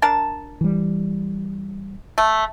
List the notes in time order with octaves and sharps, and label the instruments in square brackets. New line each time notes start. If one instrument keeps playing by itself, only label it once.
[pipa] D4 A#4 A5
[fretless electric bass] E3 G3
[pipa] A3